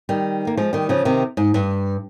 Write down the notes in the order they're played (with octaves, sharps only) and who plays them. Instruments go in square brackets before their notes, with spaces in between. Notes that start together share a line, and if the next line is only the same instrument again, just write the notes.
[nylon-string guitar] D#3 G3
A#3
F3 G#3
D#3 G3
C#3 F3
C3 D#3
G#2
G2